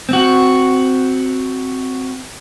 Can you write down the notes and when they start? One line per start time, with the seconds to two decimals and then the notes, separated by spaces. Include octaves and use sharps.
0.09 C4 F#4